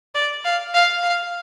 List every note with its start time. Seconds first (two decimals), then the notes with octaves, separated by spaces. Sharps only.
0.15 D5
0.44 F5
0.74 F5
1.03 F5